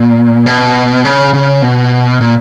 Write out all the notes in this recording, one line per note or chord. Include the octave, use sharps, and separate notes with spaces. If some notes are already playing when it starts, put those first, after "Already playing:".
Already playing: A#2
B2
C#3
C#3
B2
A#2